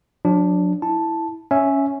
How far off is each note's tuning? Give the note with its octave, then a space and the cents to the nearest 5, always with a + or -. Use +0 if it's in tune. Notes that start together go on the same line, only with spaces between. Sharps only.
F#3 -40 D4 +0
E4 +0 A5 +0
C#4 +0 E5 +0